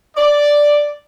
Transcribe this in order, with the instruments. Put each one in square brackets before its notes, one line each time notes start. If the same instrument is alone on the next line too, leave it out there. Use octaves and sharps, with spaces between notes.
[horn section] D5